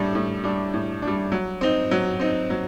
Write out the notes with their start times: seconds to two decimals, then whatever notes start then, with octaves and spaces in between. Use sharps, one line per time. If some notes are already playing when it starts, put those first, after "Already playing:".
Already playing: A2 G3 D4
0.15 A2
0.44 G3 D4
0.74 A2
1.02 D4
1.07 G3
1.32 F#3
1.61 C4 D#4
1.91 F#3
2.20 C4 D#4
2.50 F#3